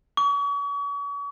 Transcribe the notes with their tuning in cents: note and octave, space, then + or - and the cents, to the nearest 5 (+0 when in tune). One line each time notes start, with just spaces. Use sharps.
C#6 +40